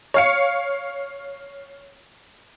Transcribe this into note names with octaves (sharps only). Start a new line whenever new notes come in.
C#5 F5 C#7